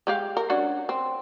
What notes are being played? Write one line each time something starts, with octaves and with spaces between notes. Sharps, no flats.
G#3 G4 F5
A#4
C#4 D4 F#4
C4